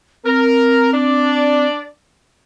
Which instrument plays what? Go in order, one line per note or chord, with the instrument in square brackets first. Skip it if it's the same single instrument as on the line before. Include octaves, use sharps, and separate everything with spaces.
[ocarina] C4 [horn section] A#4
[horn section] D4 D5